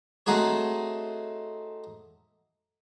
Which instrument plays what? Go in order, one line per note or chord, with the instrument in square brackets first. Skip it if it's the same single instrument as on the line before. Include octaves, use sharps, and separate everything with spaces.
[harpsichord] A3 C4 D#4 F#4 G#4 C#5